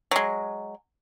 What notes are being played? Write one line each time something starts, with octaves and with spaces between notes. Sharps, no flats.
F#3 G#3